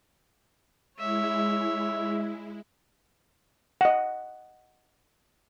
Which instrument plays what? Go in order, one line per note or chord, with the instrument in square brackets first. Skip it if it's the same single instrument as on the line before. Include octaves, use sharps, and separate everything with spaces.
[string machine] G#3 E4 [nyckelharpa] C#5 E5
[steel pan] D#5 F#5